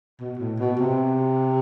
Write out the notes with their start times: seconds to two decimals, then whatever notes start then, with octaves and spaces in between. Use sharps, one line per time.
0.21 B2
0.39 A2
0.59 B2
0.78 C3